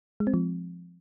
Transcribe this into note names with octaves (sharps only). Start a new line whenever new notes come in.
G#3
C4
F3